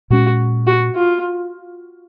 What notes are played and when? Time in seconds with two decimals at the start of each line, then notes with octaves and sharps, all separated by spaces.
0.10 A#2 G#3 C#4 F#4
0.67 F#4
0.95 F4